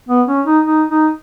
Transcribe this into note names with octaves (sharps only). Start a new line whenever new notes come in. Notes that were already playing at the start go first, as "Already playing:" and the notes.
B3
C#4
D#4
D#4
D#4